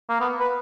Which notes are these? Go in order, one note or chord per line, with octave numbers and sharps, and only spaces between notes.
A#3
B3
B4